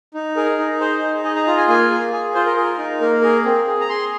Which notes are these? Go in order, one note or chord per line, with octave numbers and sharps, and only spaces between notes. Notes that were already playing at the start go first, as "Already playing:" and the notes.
D#4
G#4 A#4
D#4
G#4 C5
D#4
G#4 D#5
A#5
F4 A#5
G#5
A#3 G#5
G#4
G#4 G#5
F4 C5
A#4
G#4 A#4
D#4
A#3 A#4
G#4 A#4
C4
G#4
A#5
G#4 C6